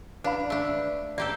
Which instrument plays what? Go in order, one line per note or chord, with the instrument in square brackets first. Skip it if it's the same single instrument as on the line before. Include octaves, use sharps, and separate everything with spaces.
[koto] D4 [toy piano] B4 F5 B5
[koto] A3 D4
[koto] A#3 G4 A4 [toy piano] D5